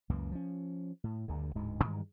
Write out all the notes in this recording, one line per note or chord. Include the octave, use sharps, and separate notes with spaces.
C#2 F#2 E3 A#3
F3 C#4
A2
D2 G2 D3
D1 D2 G#2 G#3
G2 D#3 E3 G3